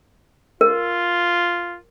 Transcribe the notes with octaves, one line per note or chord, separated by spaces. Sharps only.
F4 A#4